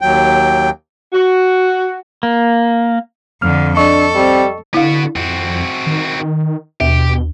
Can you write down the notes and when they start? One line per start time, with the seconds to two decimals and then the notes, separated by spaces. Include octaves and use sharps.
0.01 D#2 F#3 G5
1.13 F#4
2.23 A#3
3.42 F2 D3 F6
3.77 D4 A4 D#5 C#6
4.16 G3 C4
4.74 D3 B3 E4 F#4 F5
5.16 F2 C4 F#4
5.87 D#3
6.80 D#2 B2 G4